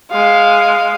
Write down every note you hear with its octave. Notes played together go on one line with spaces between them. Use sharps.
G#3 F5